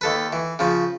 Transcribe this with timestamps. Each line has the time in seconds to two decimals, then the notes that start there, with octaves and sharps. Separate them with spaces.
0.01 D#2 A4 B4
0.33 E3
0.59 C#3 F3